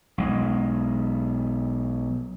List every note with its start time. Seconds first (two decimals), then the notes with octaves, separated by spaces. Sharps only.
0.18 B1 G#3